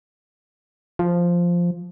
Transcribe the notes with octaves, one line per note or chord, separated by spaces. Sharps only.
F3